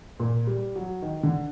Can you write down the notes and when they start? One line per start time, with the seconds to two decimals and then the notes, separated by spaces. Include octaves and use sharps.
0.20 A#2
0.47 G3
0.76 F#3
1.02 D#3
1.23 D3